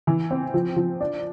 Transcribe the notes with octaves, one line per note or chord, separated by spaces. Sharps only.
E3
C4
F3
F3
D4